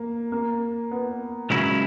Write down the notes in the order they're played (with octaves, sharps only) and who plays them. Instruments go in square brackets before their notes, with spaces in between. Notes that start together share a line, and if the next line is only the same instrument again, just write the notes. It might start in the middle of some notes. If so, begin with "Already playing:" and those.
Already playing: [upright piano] A#3
A#3
B3
[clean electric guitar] C#2 C#3 F#3 C#4 E4